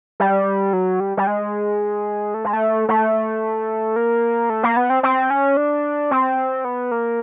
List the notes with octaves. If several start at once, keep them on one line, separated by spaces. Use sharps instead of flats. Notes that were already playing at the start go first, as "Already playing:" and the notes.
G3
F#3
G3
G3
G#3
A3
G#3
A3
A3
A#3
A3
A#3
B3
C4
C4
C#4
D4
C4
B3
A#3